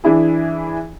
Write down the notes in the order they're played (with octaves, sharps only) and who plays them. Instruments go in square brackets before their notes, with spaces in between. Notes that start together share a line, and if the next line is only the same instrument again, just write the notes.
[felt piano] E3 D4 E4 G#4